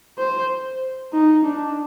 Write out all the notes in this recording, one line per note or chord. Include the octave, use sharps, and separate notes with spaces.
C5
D#4
D4